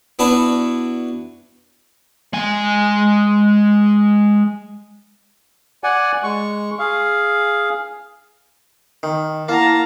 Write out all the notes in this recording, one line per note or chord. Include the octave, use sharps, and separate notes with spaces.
B3 D4 E4 F#4 B4 D5
G#3 G#5
D5 F#5 G#5
G#3 C#6
G#4 F5
D#3
A#3 E4 F#5 A5 A#5